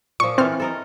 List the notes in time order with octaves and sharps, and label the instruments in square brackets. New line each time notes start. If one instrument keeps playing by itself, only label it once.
[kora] A#2 F3 [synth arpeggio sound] C#6
[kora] E3 A4 [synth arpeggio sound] C4 F6
[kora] A4 A#4 D#5